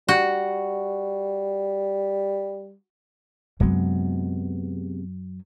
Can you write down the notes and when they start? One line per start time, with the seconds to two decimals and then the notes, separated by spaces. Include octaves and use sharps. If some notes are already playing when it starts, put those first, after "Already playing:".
0.09 G3 F#4
3.60 F#2 C3 F#3 G#3 B3